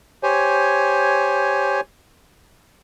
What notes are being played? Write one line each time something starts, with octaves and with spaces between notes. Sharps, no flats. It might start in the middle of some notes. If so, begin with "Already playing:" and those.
G4 C5 C#5 G#5